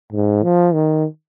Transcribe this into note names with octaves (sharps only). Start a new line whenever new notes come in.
G#2
F3
D#3